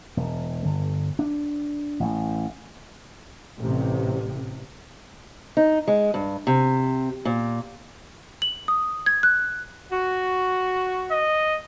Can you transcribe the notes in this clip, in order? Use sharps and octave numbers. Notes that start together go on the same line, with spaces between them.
E1
G1
D4
A1
A1 C3
D#4
G#3
G2
C3
A#2
F#7
D#6
G#6
F#6
F#4
D#5